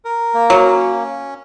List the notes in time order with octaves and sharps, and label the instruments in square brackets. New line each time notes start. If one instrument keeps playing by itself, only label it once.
[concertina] A#4
A#3
[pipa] F#3
[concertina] C#4